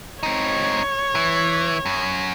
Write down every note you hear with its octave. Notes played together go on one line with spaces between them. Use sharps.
C4 D#4 C#5
E3
F#2